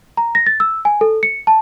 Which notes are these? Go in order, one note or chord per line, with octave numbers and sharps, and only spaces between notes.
A#5
A#6
A6
E6
G#5
A4
C#7
A5